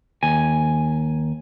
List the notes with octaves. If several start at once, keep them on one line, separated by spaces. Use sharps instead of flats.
D#2 G#5